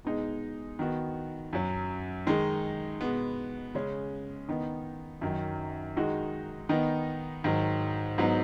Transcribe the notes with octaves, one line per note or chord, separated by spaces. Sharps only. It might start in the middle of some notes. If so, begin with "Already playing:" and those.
B2 G#3 D#4 G#4
D#3 B3 F#4
F#2 F#3 C#4
D#3 G#3 D#4
B2 G#3 B3
C#3 G#3 C#4
D#3 B3 D#4
F#2 D#3 F#3
D#3 G#3 D#4 F#4
D#3 B3 D#4
G#2 D#3 F#3
G#2 F#3 B3 D#4